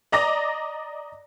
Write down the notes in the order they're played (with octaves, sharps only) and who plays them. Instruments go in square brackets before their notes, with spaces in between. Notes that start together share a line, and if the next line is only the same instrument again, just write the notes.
[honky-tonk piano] D5 D#5 A#5 D6 A#6